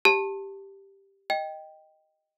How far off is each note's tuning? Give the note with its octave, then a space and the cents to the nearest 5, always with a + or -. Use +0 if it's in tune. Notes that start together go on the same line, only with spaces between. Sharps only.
G4 +0 A5 +10
D#5 +0 G5 +0